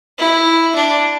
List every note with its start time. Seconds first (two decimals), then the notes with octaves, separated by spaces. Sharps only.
0.19 E4
0.75 D4